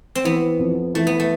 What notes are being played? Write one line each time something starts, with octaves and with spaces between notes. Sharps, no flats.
C4
E3 B3
F2
E3 A3
B3
A3